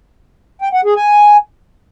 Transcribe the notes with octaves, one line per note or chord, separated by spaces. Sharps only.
G5
F#5
G#4
G#5